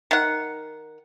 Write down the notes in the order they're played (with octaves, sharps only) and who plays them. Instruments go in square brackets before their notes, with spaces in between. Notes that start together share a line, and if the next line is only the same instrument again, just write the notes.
[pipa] D#3 F#5